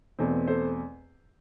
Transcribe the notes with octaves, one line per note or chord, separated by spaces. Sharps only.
E2 B2 A3 C4
A4 C5